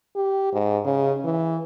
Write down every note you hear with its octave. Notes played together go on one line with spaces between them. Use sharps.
G4
G#2
C#3
E3